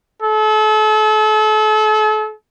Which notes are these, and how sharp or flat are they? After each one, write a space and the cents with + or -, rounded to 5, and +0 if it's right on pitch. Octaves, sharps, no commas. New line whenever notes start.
A4 -35